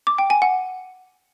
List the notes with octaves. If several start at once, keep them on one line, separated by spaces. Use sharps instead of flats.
D6
G5
G#5
F#5